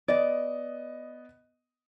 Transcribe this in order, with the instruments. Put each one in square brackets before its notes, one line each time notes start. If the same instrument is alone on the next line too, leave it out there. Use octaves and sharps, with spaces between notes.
[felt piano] B3 D#5 [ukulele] D5